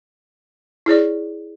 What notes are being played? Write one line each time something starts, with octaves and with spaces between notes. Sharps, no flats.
E4 G#4 C#5 D5